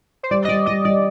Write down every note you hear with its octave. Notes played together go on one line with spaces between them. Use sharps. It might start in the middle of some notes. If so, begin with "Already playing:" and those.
C5
G3 D5
D#5
G3 D5
G3 D#5
G3 D5